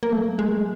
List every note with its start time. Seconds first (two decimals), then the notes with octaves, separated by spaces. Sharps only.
0.03 A#3
0.12 F#3 A3
0.38 G#3 A3